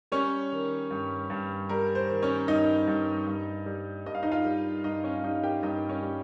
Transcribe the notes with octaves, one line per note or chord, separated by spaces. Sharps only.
G3 C#4 C#5
D#3
G2
G2
G3 A#4
C5
D#3
C#4 C#5
G2 D#4 D#5
G2
G2
G3
G2 D#5
F5
D#4 D#5
F4 F5
G3
G2 D#4 D#5
C#4 C#5
G3 D#4 D#5
G4 G5
G2 D#4 D#5
C#4 C#5
G3